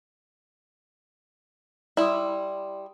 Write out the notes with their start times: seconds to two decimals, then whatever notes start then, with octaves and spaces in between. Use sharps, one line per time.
1.97 G3 E4 D5 C6 D#6